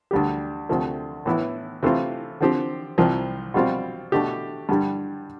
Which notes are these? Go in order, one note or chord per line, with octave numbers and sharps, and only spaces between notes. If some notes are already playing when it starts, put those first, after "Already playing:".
D2 D3 G3 D4 G4
D2 C3 F3 A3
A2 E3 B3 E4
C3 E3 A3 C4 F4
D3 F3 C4 G4
C2 C3 F3
B2 G3 C4 F4
B2 A3 D4 G4
G2 D3 G3